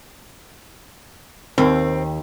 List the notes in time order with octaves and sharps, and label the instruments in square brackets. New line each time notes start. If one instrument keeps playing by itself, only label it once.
[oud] D#2 [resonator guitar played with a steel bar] C4